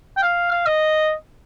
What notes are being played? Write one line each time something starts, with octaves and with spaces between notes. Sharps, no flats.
G5
F5
F5
D#5